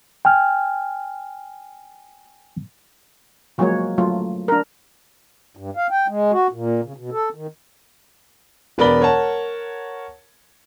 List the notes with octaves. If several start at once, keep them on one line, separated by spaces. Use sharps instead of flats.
G5 G#5 F6
F3 F#3 G#3 A#3 F#4 C#5
F#3 A3 F4
D4 A#4
G2
F5
G5
G#3
F#4
A#2
C#3
B2
A4
D#3
E1 B3 A#4 D5 B5 G7
A#4 C#5 F#5 A5